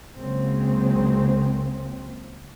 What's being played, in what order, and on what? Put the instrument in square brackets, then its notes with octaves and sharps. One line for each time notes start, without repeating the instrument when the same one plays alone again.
[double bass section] C#2 C#3 F#3 G#3 A#3 C4